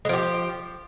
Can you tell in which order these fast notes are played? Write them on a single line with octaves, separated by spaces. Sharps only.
G#3 F3 G4